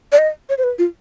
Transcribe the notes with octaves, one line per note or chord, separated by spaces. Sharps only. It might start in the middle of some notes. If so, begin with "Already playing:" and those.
D5
D#5
C#5
C5
B4
F4